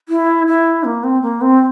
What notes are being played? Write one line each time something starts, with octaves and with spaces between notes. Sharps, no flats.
E4
E4
A#3
C4
A#3
C4